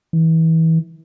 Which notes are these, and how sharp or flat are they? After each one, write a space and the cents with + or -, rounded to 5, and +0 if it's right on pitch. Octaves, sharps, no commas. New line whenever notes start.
E3 -30